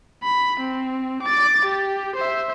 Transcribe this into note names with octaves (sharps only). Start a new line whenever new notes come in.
B5
C4
D6 A6
G4
C5 E5